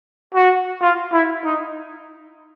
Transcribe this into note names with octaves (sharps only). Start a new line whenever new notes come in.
F#4
F4
E4
D#4